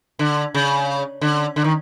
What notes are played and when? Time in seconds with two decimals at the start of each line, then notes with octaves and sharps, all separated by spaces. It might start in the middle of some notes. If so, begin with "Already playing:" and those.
0.19 D3
0.54 C#3
1.21 D3
1.56 D3
1.64 D#3